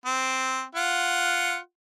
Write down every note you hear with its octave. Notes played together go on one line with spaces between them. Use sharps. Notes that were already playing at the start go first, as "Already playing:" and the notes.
C4
F4 F#5